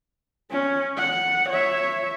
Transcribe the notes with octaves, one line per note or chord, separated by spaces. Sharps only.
C#4
F#5
C#5 E5